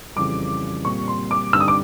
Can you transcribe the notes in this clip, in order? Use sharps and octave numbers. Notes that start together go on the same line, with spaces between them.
F2 C#3 E3 G3 D6
A#2 G3 C4 C#6
C6
D6
G2 D3 G3 C4 D#4 E6
D#6
D6